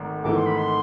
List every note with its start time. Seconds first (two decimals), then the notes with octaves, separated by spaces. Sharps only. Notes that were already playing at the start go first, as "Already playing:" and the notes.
Already playing: G#1 G#2 A3
0.24 G#1 G#2 E3 A3 D6
0.36 C6
0.46 B5
0.58 C6